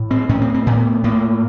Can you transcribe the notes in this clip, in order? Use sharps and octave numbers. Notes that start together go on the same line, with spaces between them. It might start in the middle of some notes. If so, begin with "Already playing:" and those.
Already playing: A2
C4
A2 C#4
C4
C4
A2 B3
A2 A#3